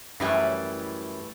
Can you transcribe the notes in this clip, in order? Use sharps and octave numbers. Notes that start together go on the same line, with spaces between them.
F#2 A2 E3 G3